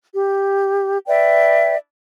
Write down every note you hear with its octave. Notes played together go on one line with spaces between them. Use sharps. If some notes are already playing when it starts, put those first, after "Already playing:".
G4
B4 D5 E5 G5